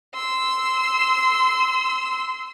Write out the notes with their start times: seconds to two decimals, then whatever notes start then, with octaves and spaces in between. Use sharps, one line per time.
0.15 C6 E6